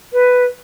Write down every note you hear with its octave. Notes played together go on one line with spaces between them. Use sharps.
B4